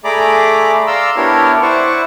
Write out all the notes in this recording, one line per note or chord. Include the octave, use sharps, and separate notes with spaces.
A3 G#4 D5 A#5 B5 D6
D5 F5 A#5 C6 E6
B3 D4 E4 G4 A#4 C#5
E4 C5 D5 F#5 C#6